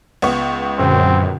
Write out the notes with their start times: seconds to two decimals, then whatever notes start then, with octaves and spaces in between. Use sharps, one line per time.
0.22 C#2 B3 C#6
0.79 F#2 A#2 D3 C4